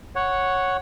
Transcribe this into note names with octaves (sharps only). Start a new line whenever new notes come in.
C#5 F#5